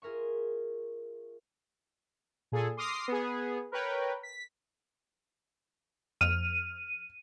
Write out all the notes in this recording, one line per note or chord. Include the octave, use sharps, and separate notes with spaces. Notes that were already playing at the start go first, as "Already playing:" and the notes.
F4 G#4 A#4 E5 C#6
A#2 G#4 A4
C6 D6 D#6 F6 A#6 C7
B3 G#4
A#4 B4 C#5 G5
B6
F2 F6 D#7